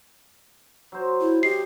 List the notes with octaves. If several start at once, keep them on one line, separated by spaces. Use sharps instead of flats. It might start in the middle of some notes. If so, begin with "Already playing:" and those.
F#3 C5
E4
G4 D#5 C7